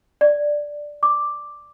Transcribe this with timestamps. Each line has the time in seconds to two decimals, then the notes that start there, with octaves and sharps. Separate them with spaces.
0.21 D5
1.03 D6